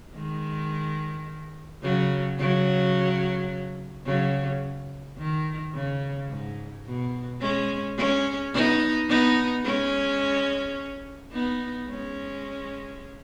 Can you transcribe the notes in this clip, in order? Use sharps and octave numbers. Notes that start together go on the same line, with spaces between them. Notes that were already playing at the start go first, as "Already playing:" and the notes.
D#3 G#3
C#3 F#3
C#3 F#3
C#3 F#3
D#3
C#3
G#2
B2
G#3 C#4
G#3 C#4
B3 D#4
B3 D#4
G#3 C#4
B3 D#4
G#3 C#4